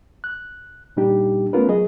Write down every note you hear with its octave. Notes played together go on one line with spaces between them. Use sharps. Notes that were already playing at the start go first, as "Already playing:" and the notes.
F#6
A#2 G3 D4 D#4 G4
A3 B3 C#4 F4 A#4 B4
F#3 G#4 D#5